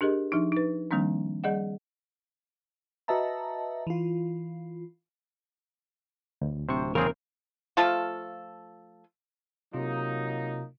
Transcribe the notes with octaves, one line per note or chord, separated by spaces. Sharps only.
D4 G4 G#4 A#4 D#5
F3 D4 D#4
D#4 B4
D#3 F3 G3 A#3 C4 D4
G3 G#4 D5 D#5 F#5
F#4 B4 D#5 E5 A5 A#5
E3 F4
D2
D1 C3 C5 C#6
E2 C#3 C4 G#4 A#4
F3 A3 F4 A4
C3 F#3 A#3 D#4 F4